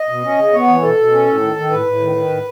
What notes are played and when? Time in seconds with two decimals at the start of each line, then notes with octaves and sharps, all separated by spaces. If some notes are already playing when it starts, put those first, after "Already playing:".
Already playing: D#5
0.09 B2
0.23 C#4
0.38 C#3
0.53 B3 C#5
0.67 E3
0.82 B2 A4
0.97 B2
1.12 C#4
1.26 A2
1.41 D#3
1.56 D#3
1.70 A2 B4
1.86 A2
2.00 D#3
2.15 D#3
2.30 A2